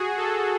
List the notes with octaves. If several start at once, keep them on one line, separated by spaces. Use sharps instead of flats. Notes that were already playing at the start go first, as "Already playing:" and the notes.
Already playing: F#4 G#4
A4